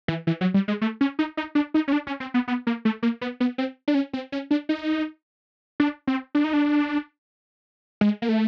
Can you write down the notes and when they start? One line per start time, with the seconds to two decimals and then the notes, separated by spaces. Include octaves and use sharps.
0.08 E3
0.27 E3
0.41 F#3
0.54 G3
0.68 G#3
0.81 A3
1.01 C#4
1.19 D#4
1.37 D#4
1.55 D4
1.74 D#4
1.88 C#4
1.92 D4
2.07 C#4
2.20 C4
2.34 B3
2.48 B3
2.67 A#3
2.85 A3
3.03 A#3
3.21 B3
3.40 B3
3.58 C4
3.88 D4
3.95 C#4
4.13 C4
4.32 C#4
4.51 D4
4.69 D#4
5.80 D4
6.07 C4
6.35 D4
6.44 D#4
6.53 D4
8.01 G#3
8.22 A#3
8.29 A3